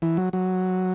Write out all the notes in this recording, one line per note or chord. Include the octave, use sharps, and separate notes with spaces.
E3
F#3
F#3